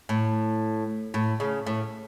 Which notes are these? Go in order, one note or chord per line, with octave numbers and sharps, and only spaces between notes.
A2
A2
C#3
A2